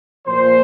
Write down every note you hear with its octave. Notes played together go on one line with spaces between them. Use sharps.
A#2 F3 C5